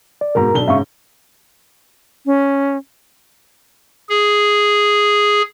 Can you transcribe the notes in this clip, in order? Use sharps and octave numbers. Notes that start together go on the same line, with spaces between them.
D5
G#2 B2 A#4 A#5
B1 D4 G7
G#2 C#3 E5 F5 C#6
C#4
G#4